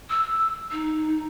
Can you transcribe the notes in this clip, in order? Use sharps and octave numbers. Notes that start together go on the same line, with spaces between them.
E6
D#4